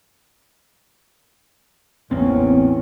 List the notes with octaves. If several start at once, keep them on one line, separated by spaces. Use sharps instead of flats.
A1 E2 A#3 C4 C#4